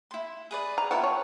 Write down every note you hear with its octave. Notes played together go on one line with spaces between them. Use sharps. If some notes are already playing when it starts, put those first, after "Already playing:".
E4 C6
G#4 B4 D5
A#5
F3 B3 E4 F#5 G5 A5
C#5